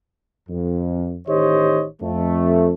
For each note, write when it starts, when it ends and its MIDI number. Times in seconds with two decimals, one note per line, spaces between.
0.49 1.16 41
1.27 1.85 33
1.27 1.85 51
1.27 1.85 67
1.27 1.85 72
1.27 1.85 73
1.27 1.85 75
2.01 2.72 41
2.01 2.72 57